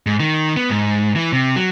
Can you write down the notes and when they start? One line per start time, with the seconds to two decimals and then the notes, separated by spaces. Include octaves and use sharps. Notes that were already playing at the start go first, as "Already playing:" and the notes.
0.06 G#2
0.20 D#3
0.57 B3
0.70 G#2
1.16 E3
1.33 C3
1.56 F#3